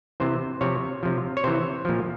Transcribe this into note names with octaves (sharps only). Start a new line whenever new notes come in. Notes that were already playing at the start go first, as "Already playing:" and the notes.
C3 E3 C5
C3 F3 C#5
C3 F3
C#5
C3 E3 C5
A#2 F3